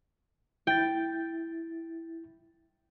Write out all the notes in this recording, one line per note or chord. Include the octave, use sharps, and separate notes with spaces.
E4 G5 A6